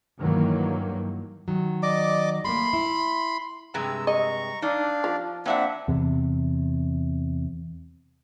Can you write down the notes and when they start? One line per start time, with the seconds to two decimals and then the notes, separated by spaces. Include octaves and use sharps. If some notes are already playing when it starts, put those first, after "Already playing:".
0.19 G2 D#3 E3 F#3 A#3
1.48 D#3 F#3
1.83 D5 D#5 D6
2.44 G3 A3 A#3 B5 C6
2.73 E4
3.74 G2 C3 G#3 A#5 E6
4.07 D#5 A#5 C#6
4.62 D4 D#4 D5 F5
5.04 F3
5.46 A#3 C4 D4 E5 F#5
5.88 E2 C3